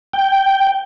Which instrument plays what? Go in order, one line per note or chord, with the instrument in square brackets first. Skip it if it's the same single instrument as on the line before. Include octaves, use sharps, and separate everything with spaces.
[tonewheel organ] G5